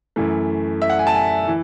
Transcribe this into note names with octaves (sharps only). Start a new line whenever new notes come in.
F#2 E3 A3
E5
F#5
G#5
A5
G#5
E3